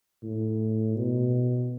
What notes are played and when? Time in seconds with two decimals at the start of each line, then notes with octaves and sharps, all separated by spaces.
0.23 A2
0.96 B2